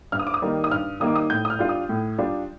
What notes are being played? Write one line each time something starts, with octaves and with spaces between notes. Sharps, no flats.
G2 F6
D#6
D6
D#6
D#3 G3 A#3 D#4
D#6
G2 F6
D#3 G3 A#3 D#4 D#6
D6
D#6
A2 G6
D#6
F6
G3 D4 F4
D#6
A2
G3 D4 F4